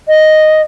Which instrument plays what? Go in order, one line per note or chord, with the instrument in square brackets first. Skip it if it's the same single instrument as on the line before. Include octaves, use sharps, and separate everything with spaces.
[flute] D#5